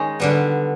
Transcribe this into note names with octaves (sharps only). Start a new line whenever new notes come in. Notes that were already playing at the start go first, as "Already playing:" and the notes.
Already playing: D#3 G#3 C#4 D#4
D3 G3 B3